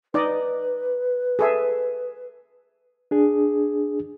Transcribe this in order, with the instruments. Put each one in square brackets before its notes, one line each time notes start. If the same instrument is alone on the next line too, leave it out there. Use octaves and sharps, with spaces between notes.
[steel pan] D#4 D5 D#5 [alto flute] B4
[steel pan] G#4 A4 E5
[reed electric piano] D4 G#4